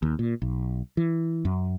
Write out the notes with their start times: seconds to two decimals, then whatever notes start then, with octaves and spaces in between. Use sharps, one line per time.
0.02 D#2
0.19 A#2
0.42 B1
0.97 E3
1.45 F#2